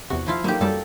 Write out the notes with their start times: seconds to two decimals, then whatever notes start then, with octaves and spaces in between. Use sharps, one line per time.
0.10 E2 C3 F#4
0.27 F3 E4 F4
0.44 F#3 A#3 D#4 G4
0.61 F#2 G3 A4 D5 A5